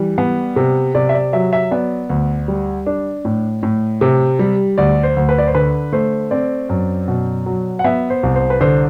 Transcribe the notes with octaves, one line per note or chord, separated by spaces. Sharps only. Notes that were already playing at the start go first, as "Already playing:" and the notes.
Already playing: E3 G3
B3
C3
C3 D5
E5
D5
F#3 E5
E5
B3 D5
D2
G3
D4
A2
A2
C3
G3
D2 D5
C5
D2
B4
D5
C5
D3 B4
A3 C5
C4 D5
F#2
B2
F#3
F#5
B3 E5
C5
C2
C5
B4
D3 C5